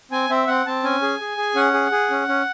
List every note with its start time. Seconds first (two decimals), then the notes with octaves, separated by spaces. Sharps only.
0.11 C4 G#5
0.30 C4 E5
0.47 C4 F#5
0.66 C4 A5
0.84 C#4 G#5
1.02 G#4
1.20 G#4
1.37 G#4
1.55 C#4 F#5
1.74 G#4
1.92 G#4
2.11 C#4
2.28 C#4